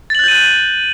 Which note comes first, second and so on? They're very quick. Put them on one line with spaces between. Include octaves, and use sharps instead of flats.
A6 F#7 F#6 G6 D#7